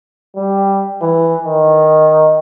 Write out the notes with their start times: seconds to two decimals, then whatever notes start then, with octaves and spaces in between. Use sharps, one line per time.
0.36 G3
1.02 E3
1.45 D#3